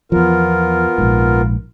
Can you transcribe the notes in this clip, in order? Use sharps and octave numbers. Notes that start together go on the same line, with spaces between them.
E2 F3 B3 F4 A#4
A#1 G#2